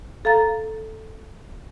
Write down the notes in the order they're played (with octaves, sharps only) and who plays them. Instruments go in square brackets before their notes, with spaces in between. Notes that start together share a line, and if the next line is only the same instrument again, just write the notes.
[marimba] A4 F5 A#5 A6